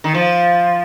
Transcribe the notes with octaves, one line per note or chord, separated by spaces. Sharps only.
D#3
F3